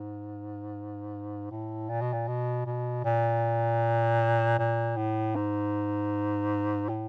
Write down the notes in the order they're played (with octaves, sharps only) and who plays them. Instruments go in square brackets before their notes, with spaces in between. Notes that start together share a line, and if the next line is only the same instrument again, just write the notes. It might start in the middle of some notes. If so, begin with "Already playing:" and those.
Already playing: [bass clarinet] G#2
A2
A#2
B2
A#2
B2
B2
A#2
A#2
A2
G#2
A2